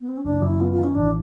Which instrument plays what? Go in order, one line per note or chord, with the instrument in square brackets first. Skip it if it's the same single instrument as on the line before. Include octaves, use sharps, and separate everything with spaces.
[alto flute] B3
C4
C#4
[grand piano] F#1 [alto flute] D4
[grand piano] F#2 [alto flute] E4
[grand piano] B3 [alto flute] F4
[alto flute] F4
[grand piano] D#3
[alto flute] C#4
[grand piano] A1 [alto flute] D4